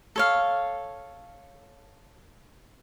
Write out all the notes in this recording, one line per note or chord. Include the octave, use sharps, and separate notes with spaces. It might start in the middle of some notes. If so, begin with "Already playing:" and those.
A4 C#5 F5